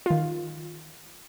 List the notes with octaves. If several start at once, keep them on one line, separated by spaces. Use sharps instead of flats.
D#3 F4